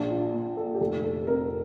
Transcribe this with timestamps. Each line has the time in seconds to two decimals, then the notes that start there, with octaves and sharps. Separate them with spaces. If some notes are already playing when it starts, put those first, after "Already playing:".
Already playing: A#1 D4
0.10 F4
0.34 A#2
0.57 A4
0.75 G4
0.80 F1 A4
1.04 A4
1.27 F2 A#4